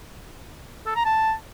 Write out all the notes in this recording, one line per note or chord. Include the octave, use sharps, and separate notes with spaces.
A4
A#5
A5